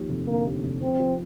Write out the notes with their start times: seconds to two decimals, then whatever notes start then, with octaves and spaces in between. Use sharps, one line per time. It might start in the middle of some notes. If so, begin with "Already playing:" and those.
Already playing: D#2 F3
0.09 F1
0.28 D3 A#3
0.46 D#2
0.64 F1
0.82 F3 C4
1.00 F3